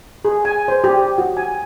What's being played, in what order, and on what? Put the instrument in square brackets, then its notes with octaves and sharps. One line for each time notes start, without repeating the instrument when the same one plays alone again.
[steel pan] G#4
G#5
C5
G4
F#4
G#5